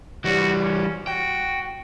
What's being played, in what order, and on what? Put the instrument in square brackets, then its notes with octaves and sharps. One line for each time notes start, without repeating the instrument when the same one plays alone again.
[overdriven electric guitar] E3 G3 [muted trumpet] F#4
[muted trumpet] C#4
[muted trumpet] F#4 [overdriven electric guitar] G5